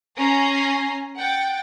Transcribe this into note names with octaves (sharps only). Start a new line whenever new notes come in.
C#4 G#5 A#5 A#6 C7
F#5 G5 A6